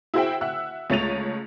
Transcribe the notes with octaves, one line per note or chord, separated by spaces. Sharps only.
E4 F#4 G#4 C5 E5 G5
E5 F#5 E6 F#6
C#2 A3 C#5 A6 D#7 F7